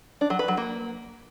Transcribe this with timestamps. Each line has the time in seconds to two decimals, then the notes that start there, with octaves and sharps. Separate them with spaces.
0.21 D4
0.30 F#3
0.39 B4
0.48 F#3
0.57 A#3